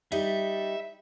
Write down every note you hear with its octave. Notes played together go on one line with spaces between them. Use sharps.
G3 D#4 E5